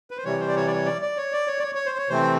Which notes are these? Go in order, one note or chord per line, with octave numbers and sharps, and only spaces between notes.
B4
C5
C3 E3 G3 C#5
C5
D5
C#5
D5
C#5
D5
D5
C#5
D5
C#5
D5
C#5
C#5
C5
C#5
C3 E3 A3 C4 C5